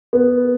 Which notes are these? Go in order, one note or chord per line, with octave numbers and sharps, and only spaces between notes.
B3